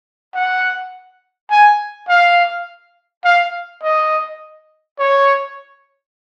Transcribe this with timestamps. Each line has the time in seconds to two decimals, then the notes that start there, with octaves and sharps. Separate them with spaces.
0.35 F#5
1.51 G#5
2.09 F5
3.25 F5
3.83 D#5
4.99 C#5